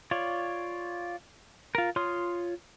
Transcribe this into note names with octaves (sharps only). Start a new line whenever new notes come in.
F4 C#5 D5
F4 A#4
F4 C#5 C6 D#6 F6